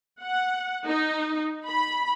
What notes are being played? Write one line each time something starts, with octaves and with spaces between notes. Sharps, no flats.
F#5
D#4
B5